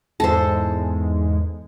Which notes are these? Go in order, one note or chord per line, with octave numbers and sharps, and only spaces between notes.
E2 G#2 G#3 A4 C5